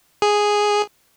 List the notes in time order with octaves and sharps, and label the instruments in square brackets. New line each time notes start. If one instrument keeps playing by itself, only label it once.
[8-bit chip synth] G#4